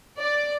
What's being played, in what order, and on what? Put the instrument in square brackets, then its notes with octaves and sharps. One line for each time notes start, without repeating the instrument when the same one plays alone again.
[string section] D5